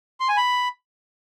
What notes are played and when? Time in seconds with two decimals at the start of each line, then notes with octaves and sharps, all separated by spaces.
0.20 C6
0.29 G#5
0.37 B5